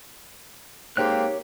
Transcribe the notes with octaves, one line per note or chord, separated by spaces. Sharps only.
G#2 A#3 C4 G4 C#5 F#6